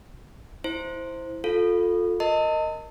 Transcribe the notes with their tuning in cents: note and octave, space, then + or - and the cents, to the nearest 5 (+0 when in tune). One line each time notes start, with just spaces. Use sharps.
E4 -5 C5 +0
F4 +25 A4 +0 F5 +0
A#4 +0 D#5 +0 A5 +40